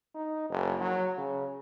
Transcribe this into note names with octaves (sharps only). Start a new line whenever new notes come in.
D#4
F#1
F#3
C#3